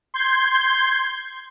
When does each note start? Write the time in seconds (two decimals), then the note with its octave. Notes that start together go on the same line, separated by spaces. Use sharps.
0.14 C6 G6 G#6